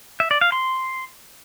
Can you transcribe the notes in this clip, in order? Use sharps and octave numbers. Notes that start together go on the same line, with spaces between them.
E5
D5
F5
C6